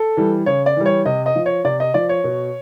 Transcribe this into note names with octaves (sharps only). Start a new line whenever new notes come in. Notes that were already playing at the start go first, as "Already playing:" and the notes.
Already playing: A4
E3 G3
C#3 C#5
D5
E3 G3
C#5
C3 D#5
D#5
F3
C#5
C3 D5
D#5
F3 D5
C#5
B2